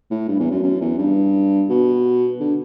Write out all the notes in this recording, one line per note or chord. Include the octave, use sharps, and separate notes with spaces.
A2
G2
E2
F#2
F#2
E2
G2
B2
D3